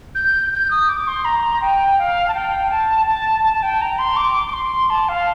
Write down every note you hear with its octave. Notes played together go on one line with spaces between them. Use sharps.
G6
G6
D#6
D6
C6
A#5
G5
F5
A5
G5
A5
A5
A5
G5
A#5
C6
D6
D6
C6
A5
F5